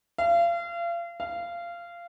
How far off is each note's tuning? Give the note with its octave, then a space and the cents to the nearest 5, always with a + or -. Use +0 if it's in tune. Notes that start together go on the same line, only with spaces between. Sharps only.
F5 -35
F5 -20